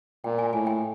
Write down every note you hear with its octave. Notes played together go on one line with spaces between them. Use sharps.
A#2 G5
G#5
A2 G#5
G5